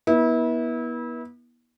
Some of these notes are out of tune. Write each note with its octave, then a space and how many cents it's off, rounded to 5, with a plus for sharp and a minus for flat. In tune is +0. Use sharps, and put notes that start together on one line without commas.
B3 -35 E4 -30